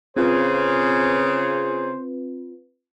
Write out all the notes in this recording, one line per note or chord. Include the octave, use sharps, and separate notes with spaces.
C#3 C4 F4 G#4 B4 C5